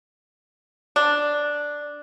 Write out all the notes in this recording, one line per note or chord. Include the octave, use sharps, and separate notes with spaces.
D4